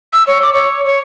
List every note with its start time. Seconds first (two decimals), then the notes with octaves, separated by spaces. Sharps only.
0.13 E6
0.27 C#5
0.42 D6
0.54 C#5
0.85 C#5